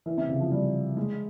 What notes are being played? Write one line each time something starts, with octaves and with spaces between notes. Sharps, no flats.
E3
C3
C#3
F3
G3
G#3